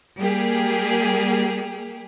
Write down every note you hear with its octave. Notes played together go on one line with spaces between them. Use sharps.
G3 A#3 G4 G#4